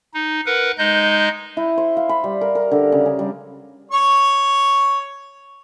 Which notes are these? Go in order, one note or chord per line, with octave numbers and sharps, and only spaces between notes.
D#4
A#4 B4 F#5
G#3 D#4 D#5 G6
E4
C5
F5
B5
G3
A#4
A#4
D3
C#3
G#4
G3
C#5 C#6